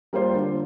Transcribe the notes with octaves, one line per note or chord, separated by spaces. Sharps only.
G3 A#3 F4 C5
D3